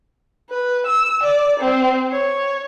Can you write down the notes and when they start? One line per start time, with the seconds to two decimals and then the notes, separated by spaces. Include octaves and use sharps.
0.50 B4
0.86 E6
1.23 D5
1.60 C4
2.12 C#5